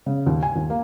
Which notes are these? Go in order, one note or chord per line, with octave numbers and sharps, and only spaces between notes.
C#3
D#2
G#5
D#2
A#3